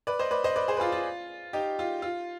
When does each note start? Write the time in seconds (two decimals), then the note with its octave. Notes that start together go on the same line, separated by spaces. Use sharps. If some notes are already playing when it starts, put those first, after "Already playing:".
0.07 B4 D5
0.19 C5 D#5
0.31 B4 D5
0.44 C5 D#5
0.56 B4 D5
0.68 G#4 C5
0.77 B4
0.80 F4 G#4
0.92 F4
1.53 D#4 G4
1.79 F4
2.02 F4